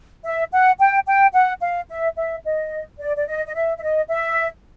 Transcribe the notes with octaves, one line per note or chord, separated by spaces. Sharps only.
E5
F#5
G5
G5
F#5
F5
E5
E5
D#5
D5
D5
D#5
D#5
E5
E5
D#5
E5